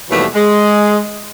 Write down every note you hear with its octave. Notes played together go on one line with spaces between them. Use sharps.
D#2 B2 E3 F#3 G3 A3
G#3